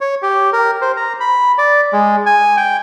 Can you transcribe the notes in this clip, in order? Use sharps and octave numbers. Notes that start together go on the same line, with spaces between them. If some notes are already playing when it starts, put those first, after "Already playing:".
C#5
G4
A#4
C5
A#5
B5
D5
G#3
G#5
G5